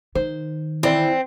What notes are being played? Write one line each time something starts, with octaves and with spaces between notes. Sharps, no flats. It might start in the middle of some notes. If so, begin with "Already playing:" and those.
D#3 C5
E3 C4 E4 D5 B5